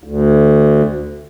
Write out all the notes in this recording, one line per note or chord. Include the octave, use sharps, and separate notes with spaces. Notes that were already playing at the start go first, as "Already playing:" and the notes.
D2